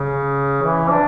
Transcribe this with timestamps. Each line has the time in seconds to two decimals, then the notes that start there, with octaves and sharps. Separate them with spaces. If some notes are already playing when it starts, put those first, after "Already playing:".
Already playing: C#3
0.63 E3
0.90 D4